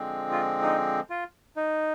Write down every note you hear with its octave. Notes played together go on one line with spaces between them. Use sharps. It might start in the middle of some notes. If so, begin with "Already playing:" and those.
Already playing: D3 F3 G#3 C4
F4
D#4
F4
D#4